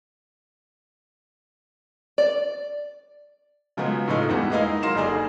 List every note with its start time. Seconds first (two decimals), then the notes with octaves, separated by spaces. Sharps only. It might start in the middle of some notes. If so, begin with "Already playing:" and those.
2.18 D5
3.77 C#3 F3 F#3 G#3 B3
4.07 A2 C#3 F3 A3 D#4
4.29 E2 G2 E3 G#3 G4 F#5
4.52 G#3 A#3 D#4 E4 D#5 F5
4.83 F#3 A#4 F5 C6 A#6 E7
4.95 F#1 D3 D#4 G#4 D5